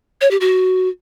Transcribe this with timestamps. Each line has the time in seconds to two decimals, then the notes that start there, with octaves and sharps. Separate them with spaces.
0.21 C#5
0.31 G4
0.41 F#4